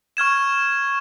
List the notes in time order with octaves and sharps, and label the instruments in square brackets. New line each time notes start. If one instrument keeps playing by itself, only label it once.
[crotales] C#6 F6 G#6 E7